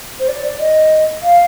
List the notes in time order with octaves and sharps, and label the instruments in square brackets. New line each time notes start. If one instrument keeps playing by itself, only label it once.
[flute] C5
D5
D5
D#5
F5